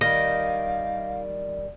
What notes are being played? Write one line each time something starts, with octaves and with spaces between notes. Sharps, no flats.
D#3 G3 D5 D#5 F5